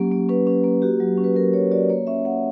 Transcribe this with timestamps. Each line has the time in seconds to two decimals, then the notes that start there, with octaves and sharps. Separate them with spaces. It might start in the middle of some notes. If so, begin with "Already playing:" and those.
Already playing: F#3 A#3 C#4 G4
0.12 A#3
0.29 C#4 B4
0.47 C#4
0.64 A#3
0.82 F#4 G4
1.00 F#3
1.18 C#4
1.24 B4
1.36 F#3 A#4
1.53 F#3 C#5
1.72 F#4 D5
1.89 A#3 C#5
2.07 C#4 E5
2.25 A#3 F#5